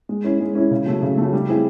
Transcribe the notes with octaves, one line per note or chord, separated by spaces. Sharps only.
G#3
C#4 E4
G#3
C#4 E4
C#3
F#3 A3
C#3
F#3 A3
G3
C4 E4 G#4